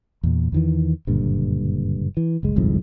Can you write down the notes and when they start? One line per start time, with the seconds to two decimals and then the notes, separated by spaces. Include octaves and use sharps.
0.23 E2 A#2
0.52 E2 D#3 E3
1.07 F#1 G2 A#2 D3
2.17 E3
2.43 F#1 C#2 G#3
2.56 G1 C2 F2 G#2